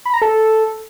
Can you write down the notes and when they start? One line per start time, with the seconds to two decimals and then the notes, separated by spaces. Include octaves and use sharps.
0.05 B5
0.14 A#5
0.22 A4